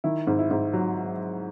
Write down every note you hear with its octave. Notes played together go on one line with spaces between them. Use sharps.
D#3 E4
G#2
E4
G#2
F#3